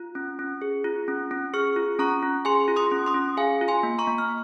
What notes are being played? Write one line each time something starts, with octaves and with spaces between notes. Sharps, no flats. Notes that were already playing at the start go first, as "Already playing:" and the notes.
Already playing: F4
C#4
C#4
G#4
F4
C#4
C#4
G#4 C#6 F6
F4
C#4 A#5 C#6
C#4
G#4 G#5 C6
F4
C6 D#6
C#4
C6 D#6
C#4
G#4 F5 G#5
F4
G#5 C6
A#3
A#5 C#6
A#3
F6